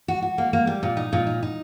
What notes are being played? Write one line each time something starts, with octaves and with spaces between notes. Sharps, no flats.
F#4
F#4
A#3
A#3
G3
A#2
D#4
A#2
D#4
D#4